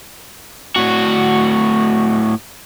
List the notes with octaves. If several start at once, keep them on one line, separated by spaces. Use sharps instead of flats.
A2 F#4